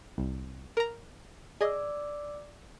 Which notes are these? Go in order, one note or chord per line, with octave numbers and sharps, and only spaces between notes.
C2
A#4 A#5
G#4 D5 D#5 D6 E6